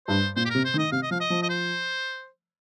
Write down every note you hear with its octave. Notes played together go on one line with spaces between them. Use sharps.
G2 C5
A#2 C5
G4
C3 A#4
C5
D#3
D#5
C3 F5
D#5
F3 F5
D#5
F3
D#5
C5